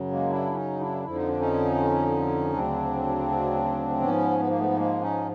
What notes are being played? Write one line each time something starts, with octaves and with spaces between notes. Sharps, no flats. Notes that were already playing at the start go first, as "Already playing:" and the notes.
Already playing: F#2 C#3 F#3
G#3 A#3
D4 E4
C#4 D#4
D4 E4
F2 D3 F3 E4
D#4
D4
C#4 D#4
D2 C#3 F#3 C4 D4
G#2 F3 B3 C#4
B3
A#3
A3 B3
A3
G#3 A#3
C#4 D#4